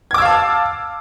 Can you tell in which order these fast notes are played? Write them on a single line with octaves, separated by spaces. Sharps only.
G#6 D6 E6 F5 A5